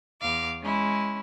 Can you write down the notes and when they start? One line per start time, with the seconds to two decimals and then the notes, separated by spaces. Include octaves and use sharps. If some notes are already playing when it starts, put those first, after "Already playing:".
0.20 E2 F5 D6
0.61 G#3 C#4 E4